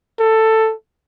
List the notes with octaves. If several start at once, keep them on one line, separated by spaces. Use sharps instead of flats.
A4